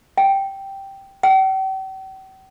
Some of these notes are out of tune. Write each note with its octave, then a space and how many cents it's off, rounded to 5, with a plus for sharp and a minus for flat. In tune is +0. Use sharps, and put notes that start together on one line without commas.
G5 -5
G5 -45